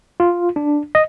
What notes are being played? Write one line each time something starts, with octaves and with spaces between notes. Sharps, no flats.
F4
D4
D#5